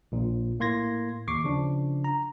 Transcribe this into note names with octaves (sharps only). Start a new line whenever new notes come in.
A#1 A#2
A2 A#3 C6 G#6 A#6
D#2 C#6 D6 C7
C#3 F3 D4
A#5